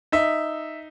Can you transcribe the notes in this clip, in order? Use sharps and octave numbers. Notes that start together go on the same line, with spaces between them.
D#4 E5